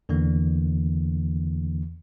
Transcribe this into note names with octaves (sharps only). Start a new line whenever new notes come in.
E2 D3 E3 A#3